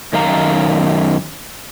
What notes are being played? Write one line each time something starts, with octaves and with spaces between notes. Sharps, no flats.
F#2 D#3 F5 A#5